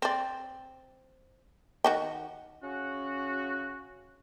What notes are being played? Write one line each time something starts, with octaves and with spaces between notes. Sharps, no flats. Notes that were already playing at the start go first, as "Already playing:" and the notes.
C4 D5
D#3 F#4 G5
C#3 C#4 F#4